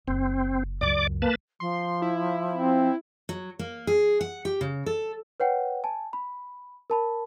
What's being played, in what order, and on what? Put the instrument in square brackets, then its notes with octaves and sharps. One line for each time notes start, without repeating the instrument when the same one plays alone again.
[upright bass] F#1 [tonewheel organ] C4
[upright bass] C#2 F#2 [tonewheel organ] D5 D6
[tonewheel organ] A#3 B4 A5
[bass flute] F3 [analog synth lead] C6
[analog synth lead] E4
[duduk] C4
[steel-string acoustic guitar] F#3
A#3
G#4
F#5
G4
C#3
A4
[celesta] B4 C#5 F#5 G5
G#5 A5
B5
A#4 A5 B5